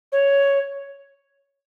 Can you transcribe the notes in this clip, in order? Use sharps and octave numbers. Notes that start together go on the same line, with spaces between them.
C#5